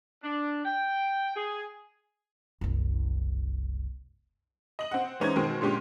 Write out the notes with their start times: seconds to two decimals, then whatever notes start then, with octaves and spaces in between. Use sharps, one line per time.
0.23 D4
0.65 G5
1.36 G#4
2.61 F#1 C2
4.79 D#5 F#7
4.91 C4 F#5
5.20 E3 G#3 C#4 D#4 C5 G#6
5.36 B2 D#3 G#3 C4
5.61 A#2 D3 G#3 C#4 G4